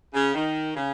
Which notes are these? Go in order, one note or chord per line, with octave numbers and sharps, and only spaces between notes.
C#3
D#3
C#3